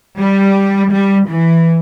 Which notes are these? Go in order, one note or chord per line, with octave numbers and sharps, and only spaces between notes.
G3
G3
E3